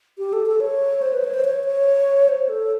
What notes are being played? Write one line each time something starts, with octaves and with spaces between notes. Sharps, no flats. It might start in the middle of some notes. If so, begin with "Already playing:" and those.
G4
A4
A4
C#5
C5
B4
C#5
C5
C#5
C#5
C5
A4